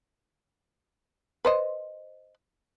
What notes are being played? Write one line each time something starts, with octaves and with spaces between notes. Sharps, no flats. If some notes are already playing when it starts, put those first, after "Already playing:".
B4 C5 D#5